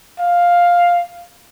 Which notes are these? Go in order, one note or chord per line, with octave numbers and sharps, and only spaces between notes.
F5